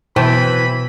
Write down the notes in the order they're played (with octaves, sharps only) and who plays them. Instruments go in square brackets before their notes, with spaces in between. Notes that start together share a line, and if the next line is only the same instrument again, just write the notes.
[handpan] B2 [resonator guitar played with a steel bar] E3 [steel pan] C5 G5 A5 [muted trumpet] B5